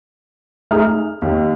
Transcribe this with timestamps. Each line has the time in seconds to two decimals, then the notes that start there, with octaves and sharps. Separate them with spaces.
0.71 A3 D#4 G#4 F6
1.22 D#2